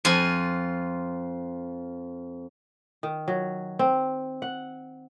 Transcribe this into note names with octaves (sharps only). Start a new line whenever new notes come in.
F2 F4 G#5
D#3
F#3
C4
F#5